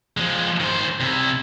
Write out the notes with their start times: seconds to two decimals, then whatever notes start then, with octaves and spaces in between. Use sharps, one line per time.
0.17 F3 G#3
0.60 D#3 C5
1.00 C3 E4